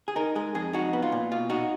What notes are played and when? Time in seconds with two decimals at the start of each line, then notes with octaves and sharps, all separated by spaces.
0.08 G#4
0.16 D#4 A#4
0.36 G#3 G#4
0.55 F2 G#4
0.73 D#4 F#4
0.93 B3
1.02 F4
1.12 A#2
1.32 B2 F4
1.49 D#4 F#4